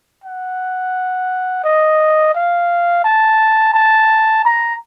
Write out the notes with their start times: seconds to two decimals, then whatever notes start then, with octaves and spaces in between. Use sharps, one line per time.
0.24 F#5
1.64 D#5
2.35 F5
3.04 A5
3.74 A5
4.45 A#5